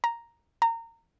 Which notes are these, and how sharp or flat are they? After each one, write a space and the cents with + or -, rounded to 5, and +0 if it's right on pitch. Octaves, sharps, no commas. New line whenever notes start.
A#5 +0
A#5 -25